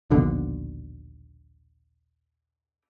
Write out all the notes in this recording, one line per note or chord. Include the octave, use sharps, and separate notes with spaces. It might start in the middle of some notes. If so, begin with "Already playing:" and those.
A#1 D#2 B2 D3